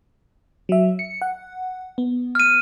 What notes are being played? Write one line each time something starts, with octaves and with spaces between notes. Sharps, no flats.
F#3 E5
C#7
F#5
B3
F6 D#7